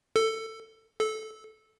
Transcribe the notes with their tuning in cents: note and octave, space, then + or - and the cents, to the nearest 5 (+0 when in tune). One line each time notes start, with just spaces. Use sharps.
A4 +15
A4 -15